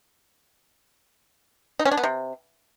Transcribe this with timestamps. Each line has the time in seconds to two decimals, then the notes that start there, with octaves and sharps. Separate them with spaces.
1.79 D#4
1.85 C#4
1.91 D4
1.97 B3
2.04 C3